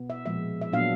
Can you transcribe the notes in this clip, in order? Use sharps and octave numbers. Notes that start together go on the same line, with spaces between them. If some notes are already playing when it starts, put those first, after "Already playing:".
Already playing: B2 B3
E5
A#2 F3 G#3 E5
E5
A#2 F#3 B3 D4 F5